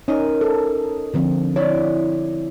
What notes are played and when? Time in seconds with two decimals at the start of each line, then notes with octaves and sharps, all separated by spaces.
0.08 C#4 D#4 A#4 D#5
0.41 A4
1.14 D3 F3 C4
1.56 C4 E4 C#5 D5